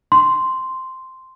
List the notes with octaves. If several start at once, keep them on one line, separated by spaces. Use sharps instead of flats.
C6